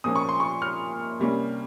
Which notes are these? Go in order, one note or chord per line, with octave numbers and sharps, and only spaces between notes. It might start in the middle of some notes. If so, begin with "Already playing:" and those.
A#2 F3 A#3 C#4 D#6
C#6
C6
C#6
F6
C3 G3 A#3 C#4